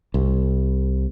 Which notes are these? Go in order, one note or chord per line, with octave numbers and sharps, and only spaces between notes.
C2